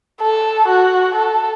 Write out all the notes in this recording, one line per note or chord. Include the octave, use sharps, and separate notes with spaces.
A4
F#4
A4